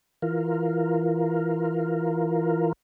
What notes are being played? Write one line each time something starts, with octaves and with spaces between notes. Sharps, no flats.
E3 F4 A#4